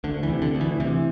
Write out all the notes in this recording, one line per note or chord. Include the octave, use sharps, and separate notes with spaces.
D2 D3
E3
C3
D3
D2
E3
C3 E3